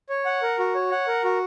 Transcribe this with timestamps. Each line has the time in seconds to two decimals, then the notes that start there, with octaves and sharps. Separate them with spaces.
0.10 C#5
0.25 F#5
0.42 A#4
0.59 F#4
0.75 C#5
0.91 F#5
1.08 A#4
1.24 F#4